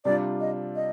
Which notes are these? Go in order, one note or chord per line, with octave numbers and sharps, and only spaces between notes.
C3 G3 D4 F4 D5
D#5
D#5